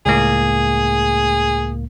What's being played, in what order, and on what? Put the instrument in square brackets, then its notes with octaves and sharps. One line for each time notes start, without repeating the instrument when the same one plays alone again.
[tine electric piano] C#2 A2 A#3 [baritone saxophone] G#4